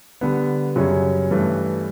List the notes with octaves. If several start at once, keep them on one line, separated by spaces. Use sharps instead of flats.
D3 G3 B3
F#2 C#3 G3 C#4
G2 E3 A3